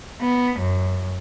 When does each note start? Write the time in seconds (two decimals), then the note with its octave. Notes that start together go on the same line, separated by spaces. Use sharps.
0.22 B3
0.59 F#2